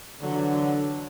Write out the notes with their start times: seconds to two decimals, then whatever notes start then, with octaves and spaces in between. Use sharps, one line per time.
0.20 D3 E3 F#3